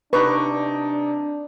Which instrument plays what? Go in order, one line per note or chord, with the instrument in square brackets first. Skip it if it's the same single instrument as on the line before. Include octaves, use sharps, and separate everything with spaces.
[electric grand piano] C3 D#4 [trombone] D4 [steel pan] B4 [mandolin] C#6 D6